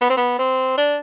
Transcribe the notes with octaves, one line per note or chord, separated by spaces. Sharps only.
B3
C4
B3
C4
D4